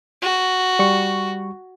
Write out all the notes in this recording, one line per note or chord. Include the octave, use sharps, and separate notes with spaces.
F#4
G3 C#6